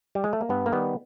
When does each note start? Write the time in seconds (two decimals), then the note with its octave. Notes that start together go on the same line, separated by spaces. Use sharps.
0.15 G3
0.24 G#3
0.33 A3
0.41 A#3
0.49 G2 B3
0.66 A#3
0.72 D#3 G3 B3